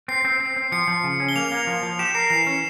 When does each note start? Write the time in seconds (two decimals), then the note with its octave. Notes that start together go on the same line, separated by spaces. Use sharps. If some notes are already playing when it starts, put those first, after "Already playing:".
0.08 C4 C7
0.25 C4
0.40 C4
0.56 C4
0.72 F3 C#7
0.88 F3
1.04 C#3
1.20 C#4
1.29 G7
1.36 A#3 F7
1.52 A#3
1.67 F3
1.83 F3
1.99 G4 E7
2.15 A#4 C7
2.30 E3 C7
2.47 C#4